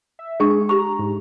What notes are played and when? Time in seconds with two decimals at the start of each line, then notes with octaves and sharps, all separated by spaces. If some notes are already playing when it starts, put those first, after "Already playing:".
0.19 E5
0.40 G#3 D4 G#4 C#6
0.69 G4 A#5 C#6
0.99 G#2